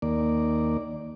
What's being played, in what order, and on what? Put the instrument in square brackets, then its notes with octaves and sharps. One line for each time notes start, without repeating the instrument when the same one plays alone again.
[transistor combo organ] D#2 A#3 D5